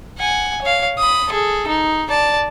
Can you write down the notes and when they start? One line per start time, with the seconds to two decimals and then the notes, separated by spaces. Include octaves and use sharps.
0.18 F#5 G#5
0.62 C#5 F5
0.98 B5 D#6
1.30 G#4 A4
1.68 D#4
2.09 D5 A5